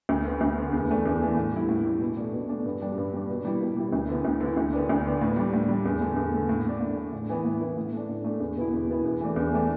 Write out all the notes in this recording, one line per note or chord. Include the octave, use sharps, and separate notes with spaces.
D2
D3 B3
D2
D3 B3
E2
E3 A3 D4
E2
E3 A3 D4
A2
G3 E4
A2
G3 E4
B2
A3 D4
B2
A3 D4
G2
G3 D4
G2
G3 D4
B2
G3 E4
B2
G3 E4
D2
D3 B3 E4
D2
D3 B3 E4
D2
D3 B3 D4
D2
D3 B3 D4
A2
G3 D4
A2
G3 D4
E2
D3 A3
E2
D3 A3
A2
A3 D4
A2
A3 D4
A2
E3 B3 E4
A2
E3 B3 E4
A2
A3 D4
A2
A3 D4
E2
B2 B3 E4
E2
B2 B3 E4
E2
E3 A3 D4
E2
E3 A3 D4